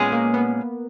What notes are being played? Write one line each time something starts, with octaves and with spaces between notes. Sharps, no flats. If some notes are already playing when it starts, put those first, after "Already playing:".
Already playing: A#2 G#3 B3 C#4 G#4
A#3
B3